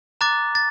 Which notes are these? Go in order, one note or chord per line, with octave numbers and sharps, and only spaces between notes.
A#5 D6 F#6 A6
A6